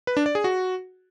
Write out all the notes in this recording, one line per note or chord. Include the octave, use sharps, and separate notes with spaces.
B4
D4
D5
G#4
F#4